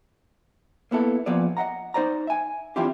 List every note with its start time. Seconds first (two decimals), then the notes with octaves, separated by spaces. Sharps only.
0.91 A#3 B3 E4 A4
1.26 A#2 F3 B3 G#4 D5
1.57 D#5 E5 F#5 A#5
1.94 D#4 C5 D5 A#5
2.27 E5 G#5
2.76 E3 C4 D4 E4 F4 G4